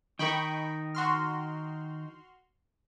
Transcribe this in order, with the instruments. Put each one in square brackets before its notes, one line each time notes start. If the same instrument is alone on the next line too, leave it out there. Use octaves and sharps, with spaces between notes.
[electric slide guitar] D#3 D#4 A#4 [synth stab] G5 B5 C#6
[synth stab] F#4 C6 F6